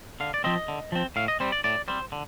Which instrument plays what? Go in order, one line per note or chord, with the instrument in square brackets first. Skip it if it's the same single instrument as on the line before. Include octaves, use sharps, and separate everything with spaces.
[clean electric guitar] D3 F5
D5
F3 C4 D#5
D3
F3 C4
A2 F5
D#5
G3 C4 C5
D5
A2 D5
G3 C4 C5
D3